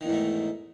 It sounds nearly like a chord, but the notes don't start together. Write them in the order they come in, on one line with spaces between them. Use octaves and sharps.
D#3 E2 G#2 A3